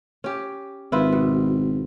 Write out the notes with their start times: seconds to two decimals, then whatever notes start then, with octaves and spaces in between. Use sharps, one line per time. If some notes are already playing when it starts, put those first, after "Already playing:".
0.24 C#4 G4
0.92 G#1 E4 F4 B4
1.13 B2